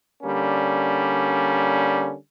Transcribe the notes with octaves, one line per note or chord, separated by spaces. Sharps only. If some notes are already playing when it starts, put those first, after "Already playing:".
D3 G3 A#3 C#4